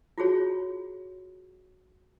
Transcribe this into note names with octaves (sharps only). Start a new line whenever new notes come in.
F4 F#4 G#4 C#5